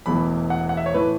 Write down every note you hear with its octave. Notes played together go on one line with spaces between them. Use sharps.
E1 E2 E3 A3 B5
F#5
F#5
E5
C#5
A2 E3 A3 B4